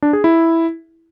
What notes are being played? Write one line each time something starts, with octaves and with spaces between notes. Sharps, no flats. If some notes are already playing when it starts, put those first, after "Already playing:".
D4
G#4
E4